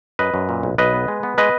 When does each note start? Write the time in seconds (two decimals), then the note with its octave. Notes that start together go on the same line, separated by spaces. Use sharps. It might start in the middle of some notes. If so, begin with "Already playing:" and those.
0.19 F#2 B4 D#5
0.34 F#2
0.49 A#2
0.63 B1
0.78 B1 B4 D#5
0.94 B3
1.08 G#3
1.23 B3
1.38 G#3 B4 D#5